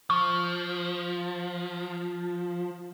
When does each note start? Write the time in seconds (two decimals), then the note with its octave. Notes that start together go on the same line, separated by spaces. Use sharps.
0.10 F3 C#6